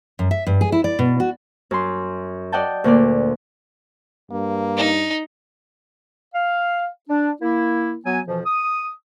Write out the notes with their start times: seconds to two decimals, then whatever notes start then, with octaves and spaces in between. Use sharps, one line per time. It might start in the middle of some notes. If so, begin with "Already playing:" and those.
0.19 F#2
0.31 E5
0.47 G2
0.61 G#4
0.72 E4
0.84 D5
0.99 B2
1.20 F#4
1.71 F#2 C6
2.52 D5 D#5 F#5 G5 A5
2.84 D2 A#2 A#3 D5
4.31 G2 A#3
4.77 D#4
6.35 F5
7.09 D4
7.42 A#3 E4
8.06 F#3 B3 G#5
8.27 F2 B2 E3 F3
8.46 D#6